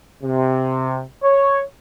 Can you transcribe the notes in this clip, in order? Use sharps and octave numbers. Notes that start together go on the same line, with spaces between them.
C3
C#5